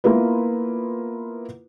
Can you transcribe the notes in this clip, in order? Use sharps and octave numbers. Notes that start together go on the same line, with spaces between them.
A#3 B3 E4 F4 A#4 B4